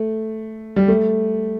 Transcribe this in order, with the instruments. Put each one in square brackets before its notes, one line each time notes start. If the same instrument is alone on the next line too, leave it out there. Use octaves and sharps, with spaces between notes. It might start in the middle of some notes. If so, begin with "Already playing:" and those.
Already playing: [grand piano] A3
G3
A3